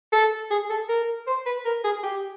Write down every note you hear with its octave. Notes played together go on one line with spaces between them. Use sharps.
A4
G#4
A4
A#4
C5
B4
A#4
G#4
G4